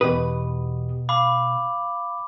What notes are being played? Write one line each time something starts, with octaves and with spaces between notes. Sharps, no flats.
E2 B2 G4 B4 D#6
F5 B5 D6